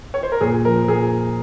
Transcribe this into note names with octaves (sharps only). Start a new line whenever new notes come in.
C#5
C5
A#4
A#2 G#4
F3 A#4
A#2 G#4